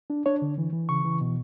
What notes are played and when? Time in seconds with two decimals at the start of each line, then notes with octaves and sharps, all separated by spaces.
0.10 D4
0.26 D4 C#5
0.42 D3
0.58 E3
0.73 E3
0.89 C#3 C#6
1.05 E3
1.21 B2